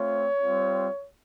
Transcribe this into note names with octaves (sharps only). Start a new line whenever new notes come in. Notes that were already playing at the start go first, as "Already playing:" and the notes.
Already playing: A3 C4 F4 C#5
G3 C4 F4